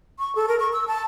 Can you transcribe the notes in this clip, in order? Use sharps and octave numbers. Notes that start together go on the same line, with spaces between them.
C#6
A4
A#4
C#6
E6
A5